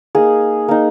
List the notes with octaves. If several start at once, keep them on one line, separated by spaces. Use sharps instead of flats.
A#3 D#4 G#4
A#3 D#4